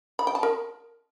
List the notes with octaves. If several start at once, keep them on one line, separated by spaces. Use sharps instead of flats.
B5
G5
A5
A#4